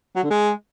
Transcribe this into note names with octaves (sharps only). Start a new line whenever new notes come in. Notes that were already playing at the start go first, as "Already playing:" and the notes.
F#3
D3
G#3